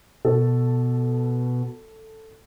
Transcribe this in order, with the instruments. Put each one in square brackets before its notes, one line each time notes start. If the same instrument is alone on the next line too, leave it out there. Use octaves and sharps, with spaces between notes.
[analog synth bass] B2 [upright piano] A4